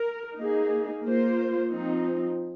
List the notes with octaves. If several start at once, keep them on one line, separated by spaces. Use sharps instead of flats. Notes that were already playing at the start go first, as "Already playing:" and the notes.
Already playing: A#4
A#3 D#4 G#4
A#3 F4 C5
F3 C4 D#4